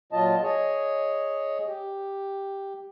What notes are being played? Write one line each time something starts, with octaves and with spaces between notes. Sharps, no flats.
A#2 F#3 F4 D#5 A5
G#4 C#5 D#5
G4